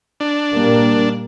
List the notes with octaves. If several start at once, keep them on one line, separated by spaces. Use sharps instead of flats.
D4
A#2 G3 A#3